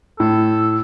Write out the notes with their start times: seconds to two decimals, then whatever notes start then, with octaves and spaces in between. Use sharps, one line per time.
0.20 A2 A4